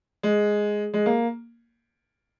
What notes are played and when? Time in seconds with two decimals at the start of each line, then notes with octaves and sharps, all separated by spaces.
0.23 G#3
0.94 G#3
1.06 A#3